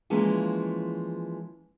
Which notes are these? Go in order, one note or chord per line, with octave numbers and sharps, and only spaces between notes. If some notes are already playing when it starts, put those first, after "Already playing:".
E3 F3 G#3 A#3 C#4